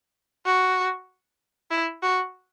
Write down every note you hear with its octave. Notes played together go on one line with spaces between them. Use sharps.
F#4
E4
F#4